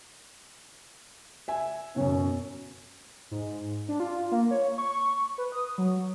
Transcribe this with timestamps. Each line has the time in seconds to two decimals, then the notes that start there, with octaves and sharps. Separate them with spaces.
1.48 E5 G#5
1.96 F#2 B2 C#4
3.31 G#2
3.88 D4
4.00 F4
4.32 A#3
4.51 C#5
4.78 C#6
5.38 B4
5.52 D#6
5.78 F#3